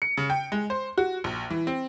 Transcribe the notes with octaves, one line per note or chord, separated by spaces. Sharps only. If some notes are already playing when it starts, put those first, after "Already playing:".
C#7
C#3
G5
G#3
C5
F#4
A#1
E3
C4